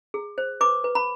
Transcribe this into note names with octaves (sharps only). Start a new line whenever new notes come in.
G#4
C5
B4 D6
B4
B5